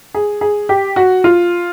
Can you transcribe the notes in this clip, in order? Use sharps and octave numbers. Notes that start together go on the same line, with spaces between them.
G#4
G#4
G4
F#4
F4